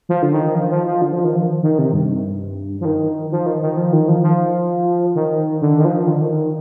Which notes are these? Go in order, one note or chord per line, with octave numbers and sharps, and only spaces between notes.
F3
D3
D#3
F3
F3
F3
D3
F3
D#3
F3
D#3
C3
G2
F3
D#3
F3
D#3
D#3
F3
D#3
F3
F3
D#3
D3
D#3
F3
D#3
D3
D#3